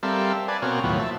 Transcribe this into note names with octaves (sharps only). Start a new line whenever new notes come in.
G3 C4 A4 A#4 E5 F5
B4 D5 G#5 A5
B2 A#3 C4 F#4 C#5 F6
D#2 A2 F3 F#3 B3
E5 A5